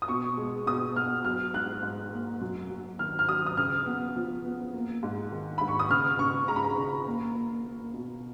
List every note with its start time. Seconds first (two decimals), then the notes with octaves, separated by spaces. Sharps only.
0.02 D#6
0.08 B2 C#6
0.37 G#3
0.66 B2 D#6
0.95 B3 F6
1.25 F#3 F6
1.54 G#2 F#6
1.83 G#2
2.12 A#3
2.41 F#2
2.70 F#3
2.99 D#3 F6
3.19 F6
3.28 F#3 D#6
3.46 D#6
3.57 C#3 F6
3.86 B3
4.15 F3
4.45 B3
4.74 A#3
5.03 G#2
5.32 D#3
5.58 G#2 B5
5.68 C#6
5.79 D#6
5.90 C#3 F6
6.19 C#3 C#6
6.48 G#3 A#5
6.56 B5
6.64 A#5
6.77 C#3
7.06 A#3
7.35 A#3
7.65 A#3
7.94 B2